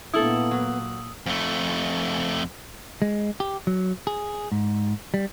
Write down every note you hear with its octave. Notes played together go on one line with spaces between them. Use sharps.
A#2 A#3 B3 E4 A4 D#6 E6 F#7
F#3
F2 A3
G#3
G4
F#3
G#4
G#2
G3